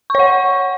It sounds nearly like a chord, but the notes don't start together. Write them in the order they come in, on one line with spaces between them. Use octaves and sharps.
C#6 C#5 F#5